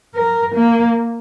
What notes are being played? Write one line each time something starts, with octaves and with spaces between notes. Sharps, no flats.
A#4
A#3